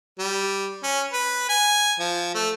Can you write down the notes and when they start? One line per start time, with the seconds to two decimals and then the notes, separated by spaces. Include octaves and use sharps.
0.19 G3
0.83 C#4
1.13 B4
1.49 G#5
2.00 F3
2.35 A3